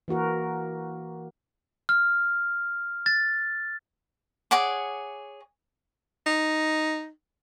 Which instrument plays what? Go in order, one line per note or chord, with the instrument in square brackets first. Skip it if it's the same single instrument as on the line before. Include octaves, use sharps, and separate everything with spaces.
[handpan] E3 A#3 F#4 A#4
[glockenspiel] F6
A6
[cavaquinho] G#4 C#5 F#5 D6
[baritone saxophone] D#4